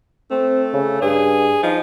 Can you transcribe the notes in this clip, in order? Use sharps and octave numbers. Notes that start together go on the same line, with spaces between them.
A3 C4
C#3
G2 G#4
F3 D#4